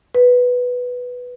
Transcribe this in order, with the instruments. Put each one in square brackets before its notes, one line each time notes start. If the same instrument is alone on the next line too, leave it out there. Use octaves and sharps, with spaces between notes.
[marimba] B4